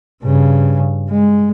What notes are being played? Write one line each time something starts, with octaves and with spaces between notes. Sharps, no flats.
G2 C#3
G#3